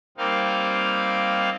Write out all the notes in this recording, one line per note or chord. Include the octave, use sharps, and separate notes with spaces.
G3 A#3 C4 D#4 F5